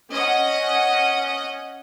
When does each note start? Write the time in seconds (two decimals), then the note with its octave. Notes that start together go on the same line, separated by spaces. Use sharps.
0.11 C#4 D#5 F#5